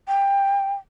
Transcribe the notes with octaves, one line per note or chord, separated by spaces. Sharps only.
G5